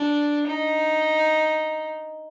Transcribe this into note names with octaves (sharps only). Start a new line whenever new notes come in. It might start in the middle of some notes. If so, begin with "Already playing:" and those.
Already playing: D4
D#4